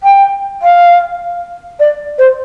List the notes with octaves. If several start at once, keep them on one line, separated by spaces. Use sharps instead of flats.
G5
F5
D5
C5